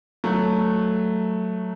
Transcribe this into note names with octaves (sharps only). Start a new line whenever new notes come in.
F#3 A3